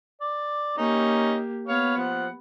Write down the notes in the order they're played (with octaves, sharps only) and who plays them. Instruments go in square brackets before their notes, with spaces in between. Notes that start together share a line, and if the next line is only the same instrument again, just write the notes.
[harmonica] D5
[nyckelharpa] A#3 G4 [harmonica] C#4 D#4
[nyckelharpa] B3 [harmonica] C#5 F5
[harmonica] F3 F#5